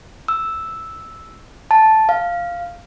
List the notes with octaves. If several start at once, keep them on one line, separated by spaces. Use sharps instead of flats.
E6
A5
F5